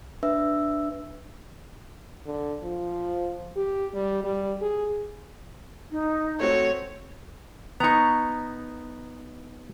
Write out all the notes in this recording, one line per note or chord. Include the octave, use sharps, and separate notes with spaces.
D4 B4 E5 E6
D3
F3
G4
G3
G3
G#4
D#4
A3 C4 F#4 C#5
B3 D#4 A#5 C#6